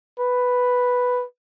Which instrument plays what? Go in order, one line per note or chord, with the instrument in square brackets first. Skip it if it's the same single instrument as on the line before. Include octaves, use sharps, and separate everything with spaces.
[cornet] B4